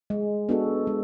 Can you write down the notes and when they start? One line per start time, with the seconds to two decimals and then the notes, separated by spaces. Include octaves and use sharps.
0.10 G#3
0.49 B3 D4 F#4 A4
0.87 G#3